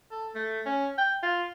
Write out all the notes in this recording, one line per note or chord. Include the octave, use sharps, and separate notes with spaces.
A4
A3
C#4
G5
F4